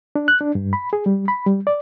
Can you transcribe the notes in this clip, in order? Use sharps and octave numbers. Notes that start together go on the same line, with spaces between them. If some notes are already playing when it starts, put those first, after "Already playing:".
D4
F#6
D4
G2
B5
G#4
G3
B5
G3
D5